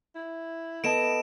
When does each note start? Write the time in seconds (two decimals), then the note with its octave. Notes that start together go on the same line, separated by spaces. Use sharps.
0.15 E4
0.84 B3 A4 D#5 A5 D7 E7